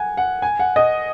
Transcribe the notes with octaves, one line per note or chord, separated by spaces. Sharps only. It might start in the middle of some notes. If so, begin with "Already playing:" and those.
Already playing: F#5 G#5
F#5
G#5
F#5
D#5